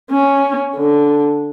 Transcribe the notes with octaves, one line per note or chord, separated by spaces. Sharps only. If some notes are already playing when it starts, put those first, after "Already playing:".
C#4
D3